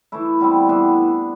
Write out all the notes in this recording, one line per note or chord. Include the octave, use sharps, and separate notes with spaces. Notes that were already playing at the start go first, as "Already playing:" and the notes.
E3 A3 E4
B2 G3 C4
E3 B3 D4